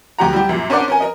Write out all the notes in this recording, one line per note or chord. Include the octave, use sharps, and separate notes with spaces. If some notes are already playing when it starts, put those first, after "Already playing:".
D2 F#3 G4 F#5 A#5
G3 E4 G4
F#2 A#2
C#4 D4 A#4 C5 D5 F#5
C#4 A#4 G#5
A#4 D#5